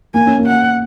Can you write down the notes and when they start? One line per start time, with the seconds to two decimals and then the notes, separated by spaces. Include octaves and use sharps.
0.14 A#3 G#5
0.26 C#4
0.38 A#3
0.46 F#5